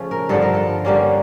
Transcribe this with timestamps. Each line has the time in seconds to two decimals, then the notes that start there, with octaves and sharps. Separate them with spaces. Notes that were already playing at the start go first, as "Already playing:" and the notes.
Already playing: C#3 F3 A3 C#4
0.11 A#4
0.29 G2 D3 F3 A4
0.42 A#4
0.54 A4
0.85 D3 G3 A#3 C#4